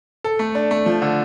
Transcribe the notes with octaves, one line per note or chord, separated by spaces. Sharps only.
A4
A3
D4
A3
F3
D3